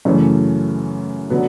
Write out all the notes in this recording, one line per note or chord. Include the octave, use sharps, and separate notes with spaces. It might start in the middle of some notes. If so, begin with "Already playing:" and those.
F#2 C#3 E3 A3 C#4
D3 F#3 B3